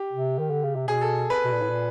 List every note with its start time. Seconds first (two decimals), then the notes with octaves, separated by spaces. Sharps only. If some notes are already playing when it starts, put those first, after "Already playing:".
Already playing: G4
0.13 C3
0.39 D#3
0.51 D3
0.63 C#3
0.75 C3
0.88 B2 G#4
1.01 A4
1.30 B4
1.45 B2
1.52 A#2
1.61 A2
1.70 A#2